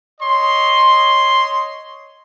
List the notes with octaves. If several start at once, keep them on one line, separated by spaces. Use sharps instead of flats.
C#5 D#5 C6